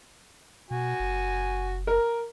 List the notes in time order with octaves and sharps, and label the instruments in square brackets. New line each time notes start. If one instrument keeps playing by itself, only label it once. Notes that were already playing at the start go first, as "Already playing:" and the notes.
[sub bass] B2 [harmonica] F#4 G#5
[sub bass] F#1
[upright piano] A#4